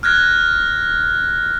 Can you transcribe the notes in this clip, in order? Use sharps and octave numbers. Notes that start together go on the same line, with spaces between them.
F6 F#6 G#6 A#6